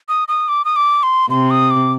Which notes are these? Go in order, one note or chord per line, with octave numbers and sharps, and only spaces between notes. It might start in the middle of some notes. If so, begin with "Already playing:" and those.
D#6
D#6
D6
D#6
D6
C6
C3 C6
D#6
D6